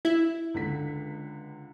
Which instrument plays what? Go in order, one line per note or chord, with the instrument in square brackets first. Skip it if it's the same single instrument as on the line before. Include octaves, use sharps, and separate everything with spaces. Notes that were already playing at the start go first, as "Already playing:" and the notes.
[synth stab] E4
[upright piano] C#2 D3 B6